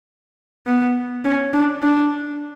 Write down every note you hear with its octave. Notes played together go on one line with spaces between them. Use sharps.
B3
C#4
D4
D4